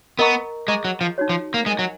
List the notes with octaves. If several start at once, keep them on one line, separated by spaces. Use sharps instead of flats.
B3 A#4 D#5 A#5 C#6
G#3 G#4 D#5 A#5 C#6
F#3
F3
D#4 F#4 C#5
F3
A#3
G#3 A#4 D#5 G#5
F#3